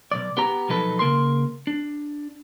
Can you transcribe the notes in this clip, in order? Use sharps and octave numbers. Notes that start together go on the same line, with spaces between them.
B1 E2 D5
B3 G4 A#5
B2 F3 F#3 D#4 A4 B4
C#3 A#3 A#4 C6
D4